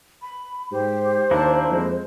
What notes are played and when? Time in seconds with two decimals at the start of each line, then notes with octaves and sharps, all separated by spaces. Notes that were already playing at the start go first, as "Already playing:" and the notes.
0.22 B5
0.71 G#2 G4 C5
1.31 D#2 A#3 D4 E4 A5
1.70 F2 G#3